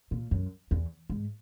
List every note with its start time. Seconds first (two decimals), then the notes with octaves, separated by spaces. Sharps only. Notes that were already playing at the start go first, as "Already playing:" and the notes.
0.11 A#2
0.31 F#2
0.71 E2
1.10 G#2